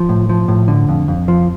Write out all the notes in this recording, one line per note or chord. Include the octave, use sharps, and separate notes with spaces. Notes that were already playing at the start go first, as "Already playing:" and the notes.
Already playing: F3
A2
F3
A2
D3
F2
F2
F3